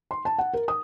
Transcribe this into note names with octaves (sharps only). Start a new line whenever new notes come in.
C6
A5
F#5
A#4
D#6